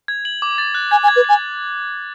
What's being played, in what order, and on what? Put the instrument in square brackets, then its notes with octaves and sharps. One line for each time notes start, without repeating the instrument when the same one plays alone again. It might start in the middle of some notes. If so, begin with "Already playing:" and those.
[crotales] G#6
F#7
D6
A6
F#6
[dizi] G#5 [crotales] G#6
[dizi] G#5
[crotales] G#6
[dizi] B4
[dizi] G#5 [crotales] G#6